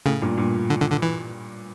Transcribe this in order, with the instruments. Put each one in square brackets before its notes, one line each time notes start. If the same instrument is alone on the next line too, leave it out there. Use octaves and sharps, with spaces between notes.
[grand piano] A2 [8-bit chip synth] C#3
[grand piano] G2 A#2
G2 A#2
[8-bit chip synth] D3
D3
D3
E3